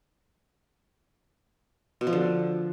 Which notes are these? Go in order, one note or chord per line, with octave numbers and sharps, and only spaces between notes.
B2
F3
D3